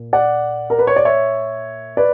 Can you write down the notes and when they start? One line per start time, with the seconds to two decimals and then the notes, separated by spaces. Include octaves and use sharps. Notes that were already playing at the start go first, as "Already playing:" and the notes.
Already playing: A#2 A#3
0.13 D5 F#5
0.70 A#4
0.79 B4
0.87 C#5
0.96 D5
1.05 C#5 E5
1.97 B4 D5